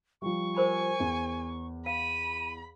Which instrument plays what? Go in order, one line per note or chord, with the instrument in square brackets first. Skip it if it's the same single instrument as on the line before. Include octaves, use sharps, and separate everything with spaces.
[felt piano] F3 G3 [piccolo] C#6
[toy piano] A#4 C5 B5 [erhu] G#5
[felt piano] E2
[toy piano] F5 [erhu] B5 [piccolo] D#7